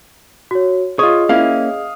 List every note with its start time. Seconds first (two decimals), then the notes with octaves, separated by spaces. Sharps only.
0.51 F#4 C#5
0.99 F4 G#4 C#5 D#5 D#6
1.29 A#3 C#4 E4 F5